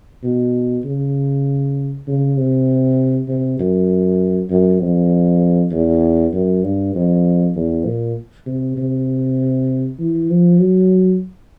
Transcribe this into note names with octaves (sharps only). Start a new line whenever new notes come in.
B2
C#3
C#3
C3
C3
F#2
F#2
F2
E2
F#2
G2
F2
E2
A#2
C3
C3
E3
F3
F#3